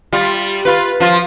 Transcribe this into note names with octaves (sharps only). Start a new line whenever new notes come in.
G3 F4
F4 B4
F3 F4